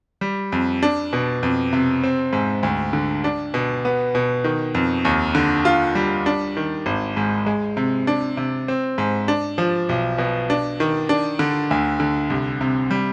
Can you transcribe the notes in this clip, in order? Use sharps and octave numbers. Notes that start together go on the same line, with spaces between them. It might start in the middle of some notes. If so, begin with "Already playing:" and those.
G3
F2
D4
B2
F2
C3
C4
G#2
D2
D3
D4
B2
B3
B2
D#3
F2
D#2
D3
F4
G3
D4
D#3
G#1
G#2
G#3
C3
D4
C3
C4
G#2
D4
F3
B1
B2
D4
D#3
D4
D3
D2
D3
C2
C3
G3